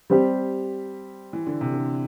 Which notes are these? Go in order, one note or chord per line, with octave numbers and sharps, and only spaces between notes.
G3 C4 G4
E3
D3
C3
D3